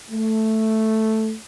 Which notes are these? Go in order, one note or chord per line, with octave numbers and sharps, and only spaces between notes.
A3